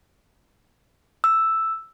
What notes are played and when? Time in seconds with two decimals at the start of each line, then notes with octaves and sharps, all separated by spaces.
1.24 E6